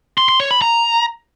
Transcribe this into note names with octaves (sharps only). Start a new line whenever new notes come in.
C6
C6
C#5
B5
A#5